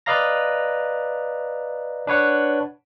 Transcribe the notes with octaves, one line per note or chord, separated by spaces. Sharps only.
B4 D5 D#5 F5 A#5 A#6
D4 B4 C#5 F#5